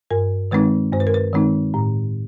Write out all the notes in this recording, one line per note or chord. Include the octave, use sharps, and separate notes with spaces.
G2 A#4
D#3 G#3 C4 D#4 B4
G2 C5
B4
A#4
B4
D#3 G#3 C4 D#4
A2